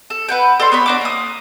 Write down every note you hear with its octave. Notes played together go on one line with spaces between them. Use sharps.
A4
B4 F#5 G5
A4 D5 G5 C6
B3 C#5 B5
D4 F#4 D6
A#3 D#6